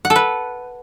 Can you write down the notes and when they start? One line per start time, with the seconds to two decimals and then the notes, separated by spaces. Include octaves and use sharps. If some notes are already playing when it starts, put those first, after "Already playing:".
0.05 F#5
0.10 A4
0.16 B4